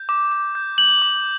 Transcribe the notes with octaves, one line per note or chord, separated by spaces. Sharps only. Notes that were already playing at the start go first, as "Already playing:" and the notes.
Already playing: G6
D6
D6
G6
G6 F#7
D6